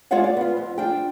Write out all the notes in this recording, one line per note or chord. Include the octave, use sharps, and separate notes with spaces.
G#3 F4 C#5 D5 F5 F#5
D5
B3 F4
F2
D4 F4 D5 G5